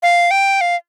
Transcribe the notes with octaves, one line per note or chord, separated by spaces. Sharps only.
F5
G5
F5